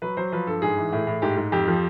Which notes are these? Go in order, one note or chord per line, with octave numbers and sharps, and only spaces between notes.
F#3 B4
F#3 C5
F3 B4
G2 A4
G#2 G#4
E3
A2
A2
G#2 G4
G#2
F2 G4
F3